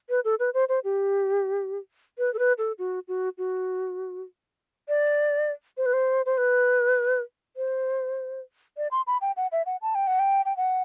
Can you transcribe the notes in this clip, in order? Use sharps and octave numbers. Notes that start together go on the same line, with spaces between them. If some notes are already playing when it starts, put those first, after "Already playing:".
B4
A4
B4
C5
C5
G4
B4
A4
B4
A4
F#4
F#4
F#4
D5
C5
B4
C5
C5
B4
C5
D5
C6
B5
G5
F#5
E5
F#5
A5
G5
F#5
G5
G5
F#5